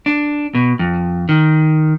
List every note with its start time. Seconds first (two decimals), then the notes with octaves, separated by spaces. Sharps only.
0.06 D4
0.55 B2
0.79 F2
1.29 D#3